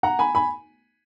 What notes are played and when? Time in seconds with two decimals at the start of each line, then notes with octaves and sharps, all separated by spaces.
0.03 F#5 A#5
0.19 G#5 B5
0.35 G#5 B5